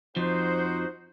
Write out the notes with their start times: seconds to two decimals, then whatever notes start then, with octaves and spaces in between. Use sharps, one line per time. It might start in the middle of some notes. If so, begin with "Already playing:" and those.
0.16 F2 F3 D#4 F#4 C5